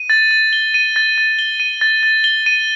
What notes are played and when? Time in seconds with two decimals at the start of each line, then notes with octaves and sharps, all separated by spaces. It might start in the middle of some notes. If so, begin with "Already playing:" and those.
Already playing: D#7
0.10 A6
0.31 A6
0.53 G7
0.74 D#7
0.96 A6
1.18 A6
1.39 G7
1.60 D#7
1.81 A6
2.03 A6
2.24 G7
2.46 D#7